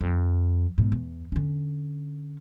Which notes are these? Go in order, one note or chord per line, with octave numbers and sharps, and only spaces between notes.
F2
G#2 B2
E2
D3 C#4